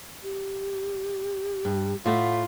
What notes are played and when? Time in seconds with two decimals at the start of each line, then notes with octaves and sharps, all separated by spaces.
0.24 G4
1.65 G2
2.06 A2 A3 F4 F#5